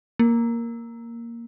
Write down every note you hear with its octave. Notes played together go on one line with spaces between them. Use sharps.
A#3